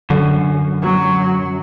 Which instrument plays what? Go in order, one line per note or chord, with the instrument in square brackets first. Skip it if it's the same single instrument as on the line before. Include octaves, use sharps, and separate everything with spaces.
[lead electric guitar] F#2 [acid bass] D3
[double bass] F#3